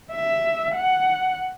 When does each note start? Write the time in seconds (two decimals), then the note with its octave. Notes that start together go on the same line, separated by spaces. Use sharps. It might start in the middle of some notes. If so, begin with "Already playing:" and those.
0.11 E5
0.75 F#5